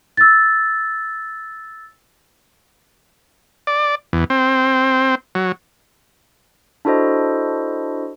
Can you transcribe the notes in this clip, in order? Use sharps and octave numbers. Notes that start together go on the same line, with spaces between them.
E6 A6
D5
E2
C4
F#3
D4 E4 F#4 A4 C5 D#5